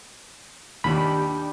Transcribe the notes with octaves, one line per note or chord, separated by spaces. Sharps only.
D#2 D4 G4 B5